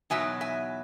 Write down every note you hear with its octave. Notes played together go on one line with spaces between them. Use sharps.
E2 B2 F#3 B3 D#4 E5 G#5
E5 G#5